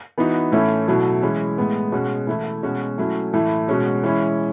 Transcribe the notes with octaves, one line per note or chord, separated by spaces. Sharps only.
E3 B3 D#4 F#4
A2 E3 A3 C#4 E4
B2 F#3 A3 E4
E3 G#3 C#4 E4
A2 G#3 B3
B2 G#3 C#4 F#4
E3 A3 E4
B2 G#3 C#4 F#4
F#3 A3 C#4 E4
A2 E3 A3 E4
B2 G#3 C#4 F#4
E3 G#3 C#4 E4